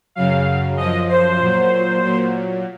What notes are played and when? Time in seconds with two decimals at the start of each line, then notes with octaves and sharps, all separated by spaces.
0.15 F#2 C#3 F#3 F5
0.77 F#2 F3 D#5
1.09 C5
1.41 A#2 F#3
2.03 A#2 F#3